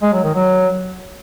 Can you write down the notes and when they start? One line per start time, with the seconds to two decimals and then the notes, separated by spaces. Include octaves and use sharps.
0.02 G#3
0.13 F#3
0.24 D#3
0.35 F#3